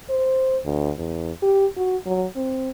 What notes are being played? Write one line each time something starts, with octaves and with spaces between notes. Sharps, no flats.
C5
D2
E2
G4
F#4
F#3
C4